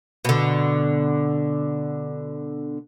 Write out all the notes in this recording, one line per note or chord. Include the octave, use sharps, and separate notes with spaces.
B2 D3